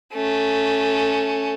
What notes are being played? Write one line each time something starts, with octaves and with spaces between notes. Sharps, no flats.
A3 C#4